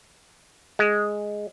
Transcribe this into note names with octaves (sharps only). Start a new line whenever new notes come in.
G#3